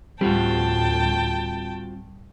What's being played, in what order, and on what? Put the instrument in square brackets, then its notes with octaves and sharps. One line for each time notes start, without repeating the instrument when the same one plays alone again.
[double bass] D2 A2 [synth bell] G3 [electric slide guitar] C4 F4 F#4 [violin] G5 A5